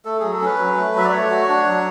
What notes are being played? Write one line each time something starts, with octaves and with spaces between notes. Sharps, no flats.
A3 A4
F#3 G#4
A4
C#4 B4
F#3
A3
F#3 E5
D5
A3 C#5
F#4
D4
F#3